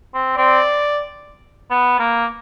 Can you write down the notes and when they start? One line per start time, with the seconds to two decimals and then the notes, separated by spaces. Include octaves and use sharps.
0.14 C4
0.37 C4 D5
1.71 B3
1.99 A#3